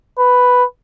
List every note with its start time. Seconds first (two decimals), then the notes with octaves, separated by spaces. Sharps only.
0.18 B4